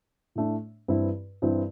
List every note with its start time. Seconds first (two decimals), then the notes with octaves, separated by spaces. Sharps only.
0.35 A2 A3 D4
0.88 G2 E3 C4 E4
1.42 G2 E3 C4 E4